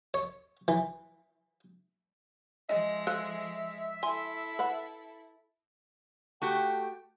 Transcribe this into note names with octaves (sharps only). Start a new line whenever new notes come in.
C#5
E3
F3 G#3 D#5 E5
A4 C5 F5 E6 F#6
E4 A4 G#5 C6
B4 F#5
A3 F#4 G4 G5